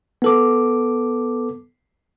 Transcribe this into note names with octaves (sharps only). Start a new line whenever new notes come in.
B3 A4 D6